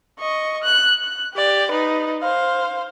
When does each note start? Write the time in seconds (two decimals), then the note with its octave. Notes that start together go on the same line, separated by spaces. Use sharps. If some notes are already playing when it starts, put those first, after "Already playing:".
0.19 D#5 C#6
0.64 F#6
1.03 F#6
1.34 G4 D5
1.71 D#4 B4
2.22 C5 F5